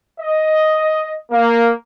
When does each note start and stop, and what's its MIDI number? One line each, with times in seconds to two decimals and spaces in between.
0.20 1.15 75
1.31 1.70 58